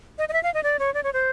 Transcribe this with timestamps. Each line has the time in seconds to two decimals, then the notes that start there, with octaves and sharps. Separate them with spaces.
0.18 D#5
0.29 D#5
0.33 E5
0.43 F5
0.54 D#5
0.63 D5
0.79 C#5
0.94 D5
1.03 C#5
1.13 C5